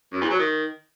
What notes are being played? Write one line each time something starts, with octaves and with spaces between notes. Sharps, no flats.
F#2
E2
F#3
D#3